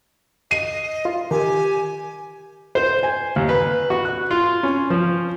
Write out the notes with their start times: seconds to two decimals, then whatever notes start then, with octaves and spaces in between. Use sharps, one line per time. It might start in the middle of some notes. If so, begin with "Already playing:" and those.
0.51 D#5 C7 D#7
1.05 F4
1.31 D#3 G4 G#5
2.75 C5
3.03 G#5
3.36 D#2
3.49 B4
3.90 F#4
4.05 F#6
4.31 F4
4.63 C#4
4.90 F3